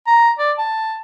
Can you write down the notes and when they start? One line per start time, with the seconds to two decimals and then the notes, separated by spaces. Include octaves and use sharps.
0.07 A#5
0.39 D5
0.58 A5